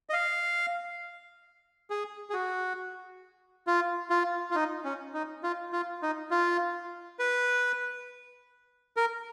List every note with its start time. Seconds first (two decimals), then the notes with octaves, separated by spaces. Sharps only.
0.10 D#5
0.13 F5
1.90 G#4
2.30 G#4
2.33 F#4
3.67 F4
4.10 F4
4.51 F4
4.55 D#4
4.85 C#4
5.14 D#4
5.43 F4
5.73 F4
6.02 D#4
6.31 F4
7.19 B4
8.97 A#4